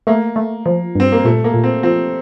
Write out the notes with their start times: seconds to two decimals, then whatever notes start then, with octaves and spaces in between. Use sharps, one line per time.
0.07 A3 A#3
0.36 A3
0.66 F3
0.95 G2 C4
1.12 A#3
1.25 A#2 A3
1.44 A#3
1.54 A#2
1.64 C4
1.83 F3 C4